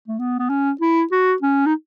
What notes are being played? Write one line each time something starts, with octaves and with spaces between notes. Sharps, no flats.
A3
B3
B3
C#4
E4
F#4
C#4
D#4